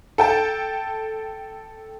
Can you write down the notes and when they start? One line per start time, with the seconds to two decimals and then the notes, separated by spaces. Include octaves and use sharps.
0.18 A4 G5 A5